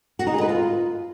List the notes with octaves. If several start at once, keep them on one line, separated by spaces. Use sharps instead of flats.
F#4
D#4
G#4
B4
F4